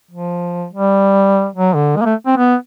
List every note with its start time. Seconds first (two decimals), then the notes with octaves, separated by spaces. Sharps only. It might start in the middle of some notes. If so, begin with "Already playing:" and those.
0.11 F3
0.73 G3
1.55 F#3
1.75 D3
1.96 G#3
2.01 A#3
2.05 A3
2.26 C4
2.37 B3